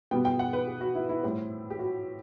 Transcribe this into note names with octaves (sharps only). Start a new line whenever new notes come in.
B2 G3 B3 G5
G5
F#5
B4
G4
F#4
E4
E4
A2 G3 C4
G4
F#4